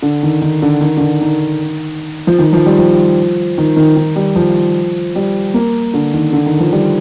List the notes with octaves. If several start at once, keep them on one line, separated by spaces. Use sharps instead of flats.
D3
D#3
D#3
D3
D#3
D3
D#3
D#3
F3
D#3
F3
G3
F3
D#3
D#3
D#3
G3
F3
G3
A#3
D3
D#3
D3
D#3
F3
G3